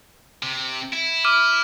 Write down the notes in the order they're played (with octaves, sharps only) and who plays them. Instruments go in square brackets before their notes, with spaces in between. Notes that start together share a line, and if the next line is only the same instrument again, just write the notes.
[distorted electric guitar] C3
E4
[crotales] D6 F6 D#7